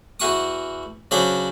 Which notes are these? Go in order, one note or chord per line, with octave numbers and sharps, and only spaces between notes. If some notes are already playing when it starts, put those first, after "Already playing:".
E2 F#4 C#6 D#6
C#3 F#3 D4 C5 B5